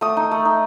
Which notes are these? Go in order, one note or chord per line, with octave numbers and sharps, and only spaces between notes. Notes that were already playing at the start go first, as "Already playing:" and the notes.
A3 D#6
D#4
A3
D#4